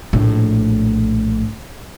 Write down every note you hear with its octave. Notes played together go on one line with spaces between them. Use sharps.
A#1 A2